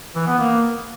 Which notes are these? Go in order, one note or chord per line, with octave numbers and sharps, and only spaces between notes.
E3
B3
A#3